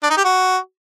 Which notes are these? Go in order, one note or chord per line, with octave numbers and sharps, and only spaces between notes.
D4
D#4
G4
F#4